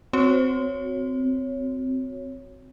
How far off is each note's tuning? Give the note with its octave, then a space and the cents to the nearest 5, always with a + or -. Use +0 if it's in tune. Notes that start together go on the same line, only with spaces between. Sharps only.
C4 -15 F#4 +0 C#5 +0